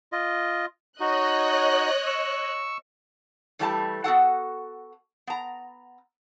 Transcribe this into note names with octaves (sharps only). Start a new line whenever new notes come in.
F4 D#5
D#4 F#4 C#5 D#5 F#6
C#6 E6
G2 E3 G3 A3 G#4 A5
B3 F#4 A4 F#5
B3 A#5